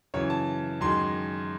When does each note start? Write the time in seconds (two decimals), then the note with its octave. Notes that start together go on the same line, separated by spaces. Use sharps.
0.14 F#2 C#3 E3 C#5
0.30 A5
0.81 F#2 D#3 G#3 C6